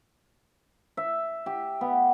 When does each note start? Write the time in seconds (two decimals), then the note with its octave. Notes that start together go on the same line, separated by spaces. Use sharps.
0.97 E5
1.46 G4
1.81 B3